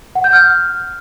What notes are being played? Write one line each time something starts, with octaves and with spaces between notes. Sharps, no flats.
F#5
G6
F6